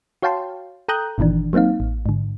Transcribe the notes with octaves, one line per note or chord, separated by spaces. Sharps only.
F#4 C#5 F5 G5 A5 C6
A4 G5 A#5 D#6 F#6 G6
G1 A#2 D#3 E3 D4
F#3 A#3 C4 D#4 F5
A1
G#2 D3